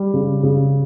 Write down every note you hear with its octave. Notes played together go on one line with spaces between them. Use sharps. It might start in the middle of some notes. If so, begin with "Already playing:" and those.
Already playing: G3
C#3
C#3